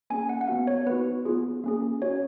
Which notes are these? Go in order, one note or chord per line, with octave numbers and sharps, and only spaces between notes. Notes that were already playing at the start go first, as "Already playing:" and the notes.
A#3 C#4 G#4 G#5
F#5
F#5
B3 F#4 F5
C#5
B3 D#4 F#4 B4
B3 F4 G#4
A#3 C#4 G#4
C#4 F#4 C#5